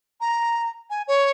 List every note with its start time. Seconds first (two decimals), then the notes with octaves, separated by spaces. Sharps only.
0.21 A#5
0.90 G#5
1.08 C#5